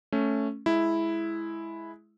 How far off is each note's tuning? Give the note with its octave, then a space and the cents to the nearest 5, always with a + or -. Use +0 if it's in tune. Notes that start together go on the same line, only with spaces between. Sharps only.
A3 +0 C#4 +0
G#3 +15 E4 +0